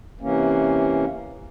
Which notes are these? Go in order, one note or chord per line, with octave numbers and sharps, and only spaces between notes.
C3 E3 A#3 C#4